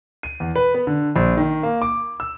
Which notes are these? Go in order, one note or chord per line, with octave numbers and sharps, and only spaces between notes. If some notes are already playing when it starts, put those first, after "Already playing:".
D#7
E2
B4
B3
D3
A#1
D#3
A#3
D6
E6